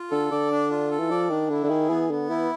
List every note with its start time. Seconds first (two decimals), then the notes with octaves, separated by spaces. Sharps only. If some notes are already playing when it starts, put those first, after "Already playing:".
Already playing: F4
0.11 D3 A4
0.31 D3 D5
0.51 D4
0.70 F4
0.91 A4
0.99 E3
1.11 F3 D5
1.30 D#3 D4
1.50 D3 E4
1.64 D3
1.70 D#3 G#4
1.89 E3 B3
2.10 D3 B3
2.30 E3 E4